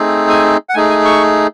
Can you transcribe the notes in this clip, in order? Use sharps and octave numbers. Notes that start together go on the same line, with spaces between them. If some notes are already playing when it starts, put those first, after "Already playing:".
Already playing: A3 C4 D#4 G#4
G#5
F#5
A3 D#4 G#4 G#5
G#5
C#6